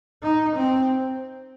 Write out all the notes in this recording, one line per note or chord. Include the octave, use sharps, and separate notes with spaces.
D#4
C4